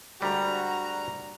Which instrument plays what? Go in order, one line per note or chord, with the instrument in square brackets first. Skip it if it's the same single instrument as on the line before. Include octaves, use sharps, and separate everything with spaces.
[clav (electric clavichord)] D2 G3 G#3 [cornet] F#4 [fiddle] A#5